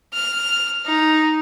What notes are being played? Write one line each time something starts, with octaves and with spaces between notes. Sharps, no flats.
F6
D#4